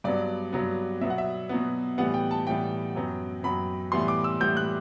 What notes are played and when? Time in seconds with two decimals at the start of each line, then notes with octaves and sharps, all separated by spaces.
0.04 G2 F#3 B3 D5
0.52 G2 F#3 B3
1.01 B2 F#3 B3 E5
1.10 F#5
1.18 E5
1.49 B2 F#3 B3
1.98 A2 E3 G3 B3 F#5
2.14 G5
2.31 A5
2.47 A2 E3 G3 B3 G5
2.95 F#2 F#3 B3
3.43 F#2 F#3 B3 B5
3.92 A2 E3 G3 B3 C6
4.08 D6
4.24 E6
4.40 A2 E3 G3 B3 G6
4.57 F#6